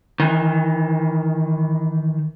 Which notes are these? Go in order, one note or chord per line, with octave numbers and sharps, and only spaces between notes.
D#3 E3